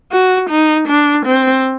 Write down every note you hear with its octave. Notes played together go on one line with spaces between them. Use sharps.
F#4
D#4
D4
C4